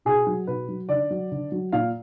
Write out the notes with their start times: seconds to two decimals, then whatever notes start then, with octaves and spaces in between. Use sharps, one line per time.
0.05 B2 G#4
0.27 F#3
0.47 B2 B4
0.68 F#3
0.89 D3 D5
1.10 F#3
1.32 D3
1.52 F#3
1.72 A#2 F5